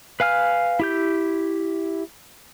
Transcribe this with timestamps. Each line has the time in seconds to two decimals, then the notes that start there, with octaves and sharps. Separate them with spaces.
0.20 B4 F5 G#5 F6
0.80 E4 G4 G6